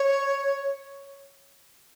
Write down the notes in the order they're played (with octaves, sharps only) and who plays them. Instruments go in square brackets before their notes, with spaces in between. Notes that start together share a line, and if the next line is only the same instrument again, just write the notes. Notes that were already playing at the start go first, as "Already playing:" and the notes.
Already playing: [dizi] C#5